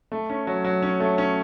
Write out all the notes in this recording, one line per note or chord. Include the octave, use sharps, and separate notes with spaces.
A3
C#4
F#3
F#3
C#4
A3
C#4